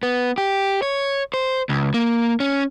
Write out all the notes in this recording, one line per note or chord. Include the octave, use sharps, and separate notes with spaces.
B3
G4
C#5
C5
C#2
A#3
C#4